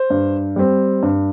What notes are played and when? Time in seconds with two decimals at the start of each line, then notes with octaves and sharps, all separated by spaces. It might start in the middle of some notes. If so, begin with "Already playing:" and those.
Already playing: C5
0.10 G2
0.56 G3 C4
1.03 G2